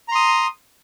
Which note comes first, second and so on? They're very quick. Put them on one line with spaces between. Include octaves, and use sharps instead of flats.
A#5 C6 D#6